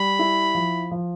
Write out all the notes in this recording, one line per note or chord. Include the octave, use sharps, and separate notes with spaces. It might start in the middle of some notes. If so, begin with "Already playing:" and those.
Already playing: G3 B5
E4
F3
F3